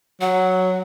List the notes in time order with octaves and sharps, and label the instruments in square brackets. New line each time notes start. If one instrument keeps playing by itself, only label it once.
[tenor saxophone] F#3 [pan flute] F#5